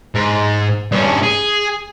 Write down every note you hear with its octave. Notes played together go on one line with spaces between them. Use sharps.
G#2
G2 C#4
G#4